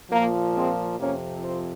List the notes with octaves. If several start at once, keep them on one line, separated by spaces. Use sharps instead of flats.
A#2 F3 A#3
G#3 C4
F2 C3 F3 A#3 C#4
C4